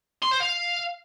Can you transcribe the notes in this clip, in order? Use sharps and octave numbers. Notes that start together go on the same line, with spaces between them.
C6
C5
F5